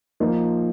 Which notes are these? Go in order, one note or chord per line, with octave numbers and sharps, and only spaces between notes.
F3 A#3 D#4